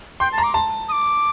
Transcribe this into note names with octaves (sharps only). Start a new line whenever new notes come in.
G5 C6
A5
A#5
D6
A5
D#6
D6